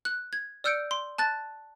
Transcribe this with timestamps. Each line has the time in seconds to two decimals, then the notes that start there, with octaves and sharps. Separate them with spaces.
0.05 F#6
0.33 G#6
0.64 D5 E6 F6 G6 C#7 D7
0.91 C6
1.18 A5 F#6 A6